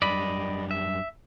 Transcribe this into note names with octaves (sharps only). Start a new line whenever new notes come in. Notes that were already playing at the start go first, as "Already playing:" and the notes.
F#2 G3 D4 D5 D#5 B5
E5